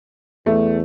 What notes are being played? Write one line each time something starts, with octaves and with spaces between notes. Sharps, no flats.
E2 A3